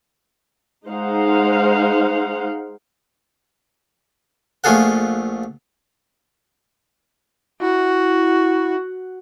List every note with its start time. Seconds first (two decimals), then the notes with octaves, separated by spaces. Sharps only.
0.88 G#3 D#4 C5 F5 F#5
4.64 A#1 A3 F4 G#4 A4 F#5
7.61 E4 F#4